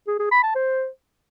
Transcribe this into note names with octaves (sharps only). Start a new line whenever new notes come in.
G#4
G#4
B5
A5
C5